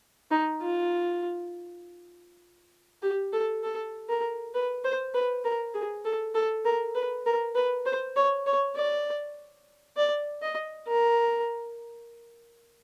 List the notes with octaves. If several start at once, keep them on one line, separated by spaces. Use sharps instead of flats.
D#4
F4
G4
A4
A4
A#4
B4
C5
B4
A#4
G#4
A4
A4
A#4
B4
A#4
B4
C5
C#5
C#5
D5
D5
D#5
A#4